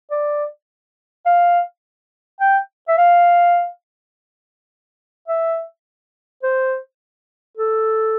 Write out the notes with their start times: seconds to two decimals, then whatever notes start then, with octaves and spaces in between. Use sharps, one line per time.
0.11 D5
1.26 F5
2.41 G5
2.88 E5
2.98 F5
5.28 E5
6.43 C5
7.58 A4